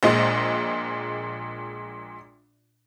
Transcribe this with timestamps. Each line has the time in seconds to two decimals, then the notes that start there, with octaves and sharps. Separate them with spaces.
0.03 A#1 A#2 G#3 D#5